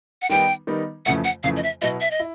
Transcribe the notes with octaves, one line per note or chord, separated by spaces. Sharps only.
F#5
D#3 G3 B3 D#4 G5
D#3 G3 B3 D#4
F2 C#3 E3 A3 F#5
F#5
F2 C#3 E3 A3 F5
D#5
E5
B2 F#3 B3 E4 D#5
E5
D#5
E4